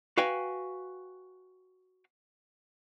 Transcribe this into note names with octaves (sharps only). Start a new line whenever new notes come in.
F#4 B4 F5 G5 G#5